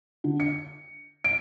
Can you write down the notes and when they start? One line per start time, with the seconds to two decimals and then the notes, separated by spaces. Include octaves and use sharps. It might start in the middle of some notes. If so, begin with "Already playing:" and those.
0.24 D3
0.40 C#7
1.24 D7